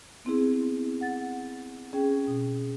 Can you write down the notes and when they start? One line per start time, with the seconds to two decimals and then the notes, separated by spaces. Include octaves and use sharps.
0.25 B3 C4 E4 G#4
1.01 F#5 A6
1.93 C#4 G#4 G5
2.27 B2